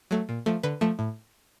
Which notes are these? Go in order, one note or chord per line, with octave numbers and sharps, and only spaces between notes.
F#3 A3
A#2
F3 A3
D3 B4
F3 A3
A2